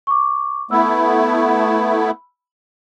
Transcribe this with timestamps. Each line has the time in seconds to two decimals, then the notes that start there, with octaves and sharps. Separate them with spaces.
0.07 C#6 D6
0.71 A3 B3 E4 B5 E6